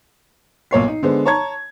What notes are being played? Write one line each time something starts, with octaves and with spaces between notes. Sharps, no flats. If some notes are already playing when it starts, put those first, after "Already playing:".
B1 A#2 C#5 C7
D#4
D3 G#3 B3 C5
C#5 A5 A#5 C#6 G#6